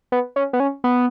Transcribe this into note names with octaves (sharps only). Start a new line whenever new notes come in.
B3
C#4
B3
C#4
B3